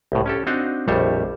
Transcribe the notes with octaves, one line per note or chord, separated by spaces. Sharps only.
C2 A2
C#4 G4 A4
C4 D4 D#4 F#4 D#5 F5
A#1 F2 G3 A3 C5 C#5